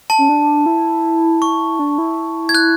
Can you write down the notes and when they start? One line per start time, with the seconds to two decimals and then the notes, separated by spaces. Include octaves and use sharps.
0.10 A5
0.18 C#4
0.29 D4
0.66 E4
1.42 C#6
1.79 D4
1.98 E4
2.49 G#6
2.55 F#6